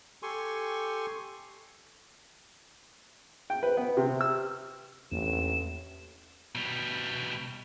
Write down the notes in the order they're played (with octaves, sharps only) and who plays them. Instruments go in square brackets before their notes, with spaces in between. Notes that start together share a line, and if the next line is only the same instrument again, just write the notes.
[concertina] G4 A4 G#5 C6 C#6
[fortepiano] G5
B4
B3
C3
E6
[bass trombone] A1 [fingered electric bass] E2 A#3 D4 [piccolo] E7
[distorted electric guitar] B2 G3